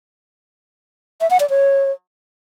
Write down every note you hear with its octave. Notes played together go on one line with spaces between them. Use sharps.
E5
F#5
D5
C#5